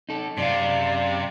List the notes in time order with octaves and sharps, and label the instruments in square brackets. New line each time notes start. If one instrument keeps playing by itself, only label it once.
[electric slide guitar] D#4 A4
[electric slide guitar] F#2 F5 [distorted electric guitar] C3 [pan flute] D5